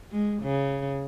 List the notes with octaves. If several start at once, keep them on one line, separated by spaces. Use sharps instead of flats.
G#3
C#3